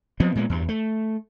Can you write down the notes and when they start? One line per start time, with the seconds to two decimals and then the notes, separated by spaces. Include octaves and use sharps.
0.20 F3 F#3 B3 C4
0.35 A#2 G#3 A3 B3
0.50 E2 G2
0.69 A3